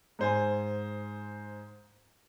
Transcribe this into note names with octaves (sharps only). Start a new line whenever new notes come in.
G#2 C5 G#5